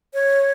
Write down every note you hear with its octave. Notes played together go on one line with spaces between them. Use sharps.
C#5